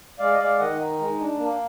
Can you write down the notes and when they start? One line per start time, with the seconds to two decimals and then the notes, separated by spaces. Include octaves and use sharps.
0.19 G#3 D5 F5
0.33 D#5
0.39 G#3 D5 F5
0.59 D#3 D#5 F#5
0.80 D#4
0.99 G#3
1.19 D4
1.38 A#3